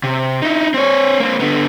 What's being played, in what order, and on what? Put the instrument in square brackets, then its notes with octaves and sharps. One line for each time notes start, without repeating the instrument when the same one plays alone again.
[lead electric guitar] C3
D#4 E4
C4 C#5
A#3 C4
D3 B3